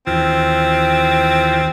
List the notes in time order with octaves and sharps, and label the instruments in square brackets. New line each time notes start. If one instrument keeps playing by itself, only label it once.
[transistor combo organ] D#2 E3 F4 [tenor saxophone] C4